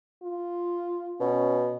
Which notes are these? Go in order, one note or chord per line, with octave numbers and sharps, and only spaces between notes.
F4
B2 C#4